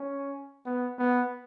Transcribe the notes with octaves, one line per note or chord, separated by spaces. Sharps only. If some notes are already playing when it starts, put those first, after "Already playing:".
Already playing: C#4
B3
B3